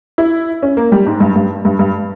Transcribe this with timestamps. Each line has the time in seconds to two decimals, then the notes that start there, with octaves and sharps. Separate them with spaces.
0.18 E4
0.63 C#4
0.77 A#3
0.92 G3
1.06 G#2
1.20 G2
1.36 G2
1.65 G2
1.79 G2